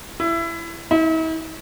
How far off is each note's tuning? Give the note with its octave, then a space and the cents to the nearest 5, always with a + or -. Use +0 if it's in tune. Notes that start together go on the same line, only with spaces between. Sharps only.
E4 +20
E4 -45